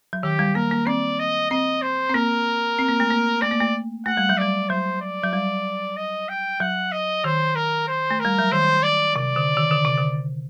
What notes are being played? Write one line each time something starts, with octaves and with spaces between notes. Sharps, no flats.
F#3
D#3 G4
G3
A#3 A#4
A#3
C4 D5
D#5
C4 D#5
C5
C4
A#3 A#4
C4
A#3
A3
A#3
A3 D5
A#3
A3
A3 F#5
G3
F#3
G3 D5
F#3 C5
D5
F#3
G3
D#5
G5
F#3 F#5
D#5
D#3 C5
A#4
C5
A3
G3 A#4
F#3
D#3 C5
D5
C3 D5
D3
D#3
D3
C3
D3